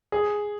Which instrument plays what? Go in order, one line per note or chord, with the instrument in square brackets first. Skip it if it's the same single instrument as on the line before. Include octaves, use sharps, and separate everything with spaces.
[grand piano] G#4